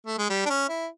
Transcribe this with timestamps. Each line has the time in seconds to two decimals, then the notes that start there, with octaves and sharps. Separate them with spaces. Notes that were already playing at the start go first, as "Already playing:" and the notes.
0.06 A3
0.18 G#3
0.30 G3
0.45 D4
0.50 C#4
0.69 E4